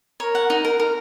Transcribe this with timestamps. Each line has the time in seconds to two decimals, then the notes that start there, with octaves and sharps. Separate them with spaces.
0.20 A#4 C#5
0.35 F#5
0.50 D#4
0.65 A#4
0.80 A#4